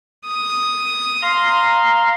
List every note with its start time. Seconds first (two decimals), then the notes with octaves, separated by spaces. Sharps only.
0.26 D#6
1.22 F5 A#5 C6